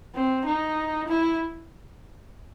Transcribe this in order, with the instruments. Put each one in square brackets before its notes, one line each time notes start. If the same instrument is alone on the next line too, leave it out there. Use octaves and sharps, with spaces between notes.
[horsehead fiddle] C4
D#4
E4